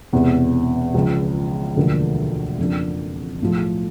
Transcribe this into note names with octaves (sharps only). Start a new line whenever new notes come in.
E1 E2 C3
C#2 C#3 F3
E1 D2 D3 F3 A#3
F2 C#3 F3 A#3 D4
B1 A2 F3